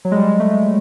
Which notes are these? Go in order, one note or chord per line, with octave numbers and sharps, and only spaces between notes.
F#3
G#3
G3
G#3
A3
G#3